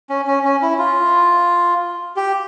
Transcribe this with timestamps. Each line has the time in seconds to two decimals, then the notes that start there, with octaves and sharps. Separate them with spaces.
0.10 C#4
0.27 C#4
0.45 C#4
0.62 E4
0.78 F4
2.16 G4